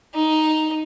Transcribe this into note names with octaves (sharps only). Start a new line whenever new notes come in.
D#4